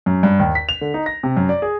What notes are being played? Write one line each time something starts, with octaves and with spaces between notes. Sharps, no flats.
F#2
G2
D#2
B6
F7
D3
D#4
A#6
C3
F#2
D5
G#4